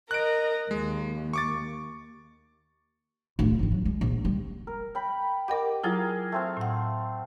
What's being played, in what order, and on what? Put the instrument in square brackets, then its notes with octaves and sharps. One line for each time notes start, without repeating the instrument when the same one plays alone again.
[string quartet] A#4 D#5 [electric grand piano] F#6 D7
[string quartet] D#2 [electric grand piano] G#3
[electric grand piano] C#6 D6 A6
[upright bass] D1 F4
G#1 D#3
F#3
G#3
A#1
F#1 G3
[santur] A#4
G5 B5
[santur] G4 D6 [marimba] A#4 D#5 F#5
[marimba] F#3 E4 F4 [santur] G#4 A#4 F5
[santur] A3 C4 F5
[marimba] A2 F#5